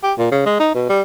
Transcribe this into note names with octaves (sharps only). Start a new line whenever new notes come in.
G4
A#2
C#3
G#3
D#4
B2
G3